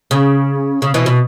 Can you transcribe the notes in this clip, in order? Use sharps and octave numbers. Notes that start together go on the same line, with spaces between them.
C#3
C#3
B2 E3
B2